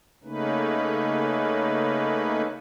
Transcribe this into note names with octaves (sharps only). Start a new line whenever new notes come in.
C#3 A3 A#3 C#4 D#4 B4